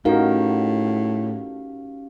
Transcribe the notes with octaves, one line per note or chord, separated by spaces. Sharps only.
A2 C#4 D#4 F#4 G4 A#4 F5